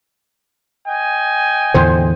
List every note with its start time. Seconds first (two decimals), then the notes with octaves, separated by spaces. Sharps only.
0.87 D#5 G5 G#5
1.74 E2 A2 D3 C5